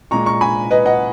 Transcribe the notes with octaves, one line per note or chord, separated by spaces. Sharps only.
A#2 G#3 A#5 C#6
A#5 C#6
G#5 B5
B4 D#5
D#5 F#5